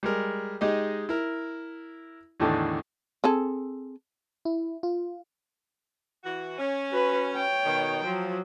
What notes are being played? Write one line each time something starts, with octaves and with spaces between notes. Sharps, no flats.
G3 G#3 A#4
G#3 D#4 G4 G#4 D#5
E4 A#4
E2 A2 D3 D#3 D4
C4 G#4 A4
E4
F4
E3 F#4
C#4
F#4 B4
C#5 G5
B2 D#3
F3 F#3